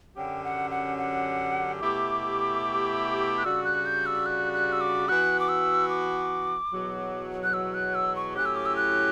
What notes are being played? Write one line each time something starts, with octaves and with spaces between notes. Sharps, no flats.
F#2 D3 F#3 C#4 G4 G5
F#5
F#5
F#5
B2 A3 E4 G4 D6
F#6
C#3 G3 D4 F#4 E6
F#6
G6
E6
F#6
F#6
E6
D6
E3 B3 F#4 F#6
D6
E6
D6
E2 B2 F#3
F#6
E6
F#6
E6
C#6
A2 F#3 C#4 E4 G4 F#6
E6
D6
E6
F#6